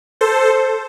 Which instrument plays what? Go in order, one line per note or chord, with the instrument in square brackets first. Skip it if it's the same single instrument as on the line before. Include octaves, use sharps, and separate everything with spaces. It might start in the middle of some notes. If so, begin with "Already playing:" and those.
[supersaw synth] A4 C5